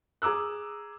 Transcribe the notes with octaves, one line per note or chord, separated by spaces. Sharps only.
G#4 A#5 D6 E6 F#6